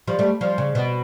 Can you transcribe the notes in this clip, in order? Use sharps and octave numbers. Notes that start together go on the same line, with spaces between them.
F3 G3
G3 A3
F3 G3
C#3
B2